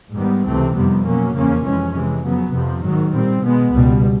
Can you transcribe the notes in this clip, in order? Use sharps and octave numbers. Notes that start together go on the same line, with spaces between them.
G#2 D#3 G3 B3
C#2 C3 E3 A3 C4
F2 C3 D#3 G3 B3
B2 F#3 A#3 C#4
E2 C#3 F3 A#3 C#4
F2 C3 E3 G#3 C#4
C3 E3 G#3
F2 C#3 F#3 B3
F2 C3 F3
G#2 D#3 F#3
A#2 G3 C4
B2 G#3 B3
C#2 B2 G3